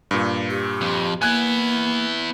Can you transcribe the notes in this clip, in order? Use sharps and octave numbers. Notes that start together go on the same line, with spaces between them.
G2 A#2
G4
F2
A#3 B3 E4 G#5 F#6 G#6